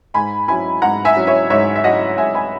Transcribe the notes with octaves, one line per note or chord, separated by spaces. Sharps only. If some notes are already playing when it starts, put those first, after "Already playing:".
G#2 G#5 B5
F#3 C#4 E4 G#5 B5
G#2 F#5 A#5
E5 G#5
F#3 C#4 E4
C#5 E5
G#2 C#5 E5
E5
F#3 C#4 E4 D#5 F#5
G#2 E5 G#5
G#5 B5